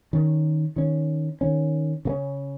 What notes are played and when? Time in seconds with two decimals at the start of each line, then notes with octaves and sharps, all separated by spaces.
0.13 D#3 C#4
0.76 D#3 C#4
1.41 D#3 C#4
2.05 C#3 A#3 C#4